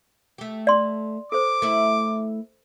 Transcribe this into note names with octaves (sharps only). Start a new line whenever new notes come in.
A3 G4
D5 C6
A4 C5 D6
A3 E4